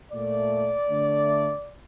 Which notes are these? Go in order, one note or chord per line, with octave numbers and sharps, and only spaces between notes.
A#2 A3 D5
D3 A3